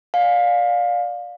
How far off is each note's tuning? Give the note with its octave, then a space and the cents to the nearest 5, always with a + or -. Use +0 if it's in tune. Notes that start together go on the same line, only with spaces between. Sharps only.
D5 +0 F5 +20 G#5 +0